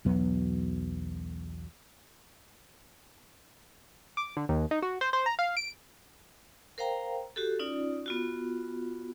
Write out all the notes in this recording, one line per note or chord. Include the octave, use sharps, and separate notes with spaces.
B1 E2 F#3 B3
D6
D3
D#2
D#4
F#4
C5
C5
A#5
F5
D7
A#4 C5 F5 G5 A#5
F#4 G4 A4
C#4 D#4 F4 D5
B3 F4 F#4